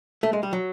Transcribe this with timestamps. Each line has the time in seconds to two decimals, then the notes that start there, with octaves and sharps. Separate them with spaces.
0.23 A3
0.33 G#3
0.43 G3
0.53 F#3